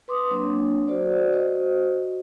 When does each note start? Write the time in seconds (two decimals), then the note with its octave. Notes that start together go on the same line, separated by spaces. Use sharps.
0.08 B4 C6 D6 D#6
0.31 F#3 A#3 C4 D4 C#5
0.87 F#4 A4 C5 D5
1.32 F#4 C5 D#5